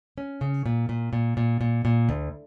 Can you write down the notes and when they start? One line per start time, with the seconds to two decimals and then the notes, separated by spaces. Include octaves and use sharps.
0.18 C#4
0.41 C#3
0.66 A#2
0.89 A#2
1.13 A#2
1.37 A#2
1.61 A#2
1.85 A#2
2.09 D2